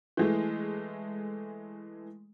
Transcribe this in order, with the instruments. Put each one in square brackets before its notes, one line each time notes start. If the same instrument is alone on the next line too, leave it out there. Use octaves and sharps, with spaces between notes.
[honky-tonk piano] E3 G#3 A3